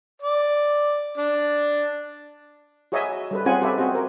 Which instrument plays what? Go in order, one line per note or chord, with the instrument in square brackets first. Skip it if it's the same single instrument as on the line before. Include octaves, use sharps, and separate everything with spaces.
[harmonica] D5
D4
[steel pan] F#4 G#4 C#5 D#5 E5 G#5
G3 A4 B4
C4 C#4 F4 G#4 F#5 G#5
F#4 G4 A4 B4 E5
C4 F#4 G#4 C5 D#5
A#4